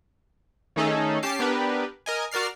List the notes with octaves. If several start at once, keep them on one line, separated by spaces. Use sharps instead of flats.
D#3 A3 C#4 D#4 G#4 A4
C#4 G4 A5 D6 C7
B3 D4 G4 A#4 B4
A#4 D#5 G#5
F#4 A#4 D5 F6 C7